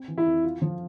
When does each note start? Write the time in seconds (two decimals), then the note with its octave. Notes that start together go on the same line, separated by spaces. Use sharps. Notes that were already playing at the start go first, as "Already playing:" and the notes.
Already playing: C4
0.08 E3
0.18 E4
0.26 F2
0.44 F4
0.62 F3